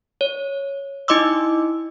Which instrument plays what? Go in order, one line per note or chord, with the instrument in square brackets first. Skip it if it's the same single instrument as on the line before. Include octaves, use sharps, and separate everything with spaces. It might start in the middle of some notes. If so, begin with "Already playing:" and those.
[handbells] C#5
D#4 E4 D#5 C6 D6 E6